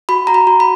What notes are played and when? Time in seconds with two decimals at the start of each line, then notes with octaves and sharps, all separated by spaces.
0.09 F#4 B5
0.27 F#4 A#5
0.34 B5
0.47 F#4
0.60 B5